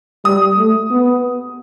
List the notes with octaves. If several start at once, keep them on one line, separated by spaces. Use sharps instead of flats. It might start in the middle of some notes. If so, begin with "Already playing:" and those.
G3 D#6
A3
B3